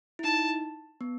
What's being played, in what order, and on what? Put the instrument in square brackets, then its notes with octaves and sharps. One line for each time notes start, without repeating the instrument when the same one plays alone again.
[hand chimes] E4
[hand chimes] D#4 [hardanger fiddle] A5
[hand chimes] B3